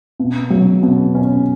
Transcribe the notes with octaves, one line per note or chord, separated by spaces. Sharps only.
B2
F#3
B2
C#4